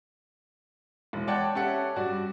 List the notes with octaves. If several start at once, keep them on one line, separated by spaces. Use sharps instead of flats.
E1
C#5 D5 F#5 G5 A5
C#4 G4 A4 E5 F#5
G2 F#4 D5